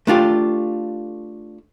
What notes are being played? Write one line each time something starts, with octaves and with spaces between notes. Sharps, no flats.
A3 D4 F4 G4